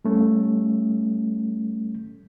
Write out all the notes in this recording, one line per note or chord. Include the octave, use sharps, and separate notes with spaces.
G3 A3 C#4